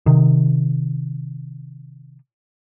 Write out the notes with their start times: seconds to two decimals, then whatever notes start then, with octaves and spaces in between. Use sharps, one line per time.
0.06 C3 D#3